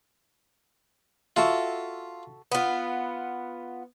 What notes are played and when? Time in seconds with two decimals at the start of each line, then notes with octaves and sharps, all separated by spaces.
1.36 F4 F#4 A4 E5
2.52 B3 F4